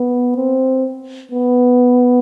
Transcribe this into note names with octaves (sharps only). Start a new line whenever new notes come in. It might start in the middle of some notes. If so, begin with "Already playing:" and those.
Already playing: B3
C4
B3